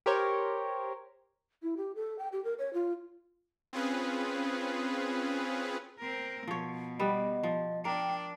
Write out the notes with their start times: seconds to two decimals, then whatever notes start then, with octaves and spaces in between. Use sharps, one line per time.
0.06 G4 A#4 C5 C#5
1.62 E4
1.77 G4
1.95 A4
2.19 G5
2.32 G4
2.44 A#4
2.58 C#5
2.73 F4
3.73 C4 C#4 F4 G#4 B4
5.99 C4 A#4
6.48 B2 F3 C#5
7.00 G3 B3 D#5
7.43 F3
7.85 D4 A#4 G5